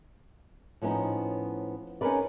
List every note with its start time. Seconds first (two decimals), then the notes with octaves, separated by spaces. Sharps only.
0.82 A2 F3 B3 C#4 D#4
2.01 C#4 D#4 F4 A#4 B4 D5